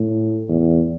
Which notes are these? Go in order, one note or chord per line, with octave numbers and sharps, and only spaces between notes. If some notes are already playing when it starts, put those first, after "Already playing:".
Already playing: A2
E2